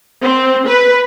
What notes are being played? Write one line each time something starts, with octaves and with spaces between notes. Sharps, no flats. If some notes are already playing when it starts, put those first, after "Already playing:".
C4
B4